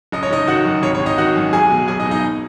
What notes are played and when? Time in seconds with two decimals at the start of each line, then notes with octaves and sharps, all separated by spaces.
0.12 F#1 D#5
0.23 C#5
0.31 F#1 D#4 D#5
0.47 D#3 F#4 F#5
0.65 F#2
0.83 G#1 C#5
0.95 C#5
1.00 G#1
1.06 D#4 D#5
1.18 D#3 F#4 F#5
1.36 F#2
1.53 B1 G#4 G#5
1.70 B2
1.88 B1 G#4 G#5
2.00 D#4 D#5
2.06 B2
2.11 D#4 D#5